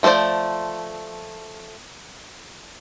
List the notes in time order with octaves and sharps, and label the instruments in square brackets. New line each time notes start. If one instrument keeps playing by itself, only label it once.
[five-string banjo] F3 A3 B3 C5 D5